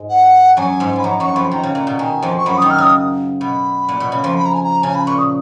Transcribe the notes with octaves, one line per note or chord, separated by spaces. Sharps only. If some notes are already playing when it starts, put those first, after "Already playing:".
Already playing: G#2 G#3
F#5
F#2 F#3 G#5
G#2 G#3
F3 B5
F#2 F#3 A#5
F#2 F#3 C#6
F2 F3 B5
D#3 A#5
C#3
A#2
B2
D#3 G#5
F2 F3
C#6
F#2 F#3 B5
D#3 D#6
F6
C#3 D#6
B2 B5
A#2
B2
C#3
F2 F3
B5
A#5
G#5
A#5
C#3 G#5
B5
A#2 C#6
D#6